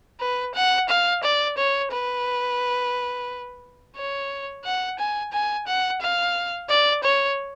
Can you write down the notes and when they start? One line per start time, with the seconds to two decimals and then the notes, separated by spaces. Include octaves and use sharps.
0.20 B4
0.55 F#5
0.89 F5
1.23 D5
1.57 C#5
1.92 B4
3.96 C#5
4.65 F#5
4.99 G#5
5.33 G#5
5.67 F#5
6.01 F5
6.69 D5
7.03 C#5